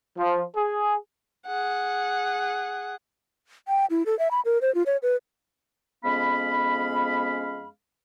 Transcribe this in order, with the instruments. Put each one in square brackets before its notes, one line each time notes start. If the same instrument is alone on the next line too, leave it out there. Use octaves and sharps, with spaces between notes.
[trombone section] F3
G#4
[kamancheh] G#4 F#5
[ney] G5
E4
A4
E5
B5
A#4
C5
F4
C#5
B4
[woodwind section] F2 G#3 B3 C#4 F5 B5